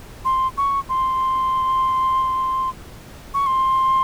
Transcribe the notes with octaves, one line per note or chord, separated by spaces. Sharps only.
C6
C#6
C6
C#6
C6